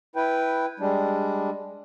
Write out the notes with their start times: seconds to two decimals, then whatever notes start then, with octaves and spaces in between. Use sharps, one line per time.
0.16 E4 B4 G5
0.80 G3 G#3 D4